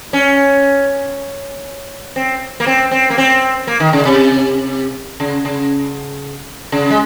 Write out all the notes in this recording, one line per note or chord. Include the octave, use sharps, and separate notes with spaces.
C#4
C4
A#3
C4
C4
A#3
C4
A#3
D#3
C#3
C3
C#3
C#3
C#3
G#3